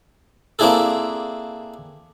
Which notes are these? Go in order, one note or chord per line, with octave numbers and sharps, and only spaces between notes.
A#3 C4 D4 E4 G#4 A4